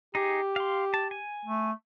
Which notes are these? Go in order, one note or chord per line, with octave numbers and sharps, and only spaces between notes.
D#4 G4 G#4
F5 C6
A5
G#5
A3